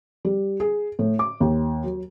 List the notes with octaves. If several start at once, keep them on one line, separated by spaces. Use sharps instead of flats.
G3
G#4
A2
D6
D#2
F#3